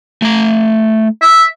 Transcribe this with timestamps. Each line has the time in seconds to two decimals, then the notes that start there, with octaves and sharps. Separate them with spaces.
0.22 A3 A#5
1.22 E5